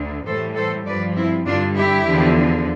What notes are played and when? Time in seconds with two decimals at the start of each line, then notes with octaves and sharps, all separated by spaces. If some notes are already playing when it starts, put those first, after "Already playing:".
Already playing: D2 D3
0.25 A2 E3 G3 A4 C5
0.56 A4 C5
0.86 G2 F3 B4 D5
1.16 C4 E4
1.46 G2 D3 G3 D4 F4
1.76 E4 G4
2.07 E2 D3 F3